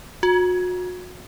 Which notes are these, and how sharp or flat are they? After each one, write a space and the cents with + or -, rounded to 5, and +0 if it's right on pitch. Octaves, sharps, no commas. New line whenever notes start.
F#4 -35